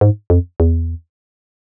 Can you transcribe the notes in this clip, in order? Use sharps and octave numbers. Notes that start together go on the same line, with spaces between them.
G#2
F2
E2